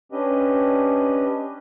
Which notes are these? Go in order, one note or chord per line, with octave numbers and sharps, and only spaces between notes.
C#4 D4 G4 B4 D#5